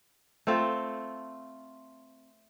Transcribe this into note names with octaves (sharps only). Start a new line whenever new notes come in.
A3 C4 F4